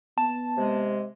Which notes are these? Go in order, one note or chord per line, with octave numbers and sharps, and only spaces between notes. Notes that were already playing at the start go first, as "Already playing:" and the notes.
B3 A5
C3 G#3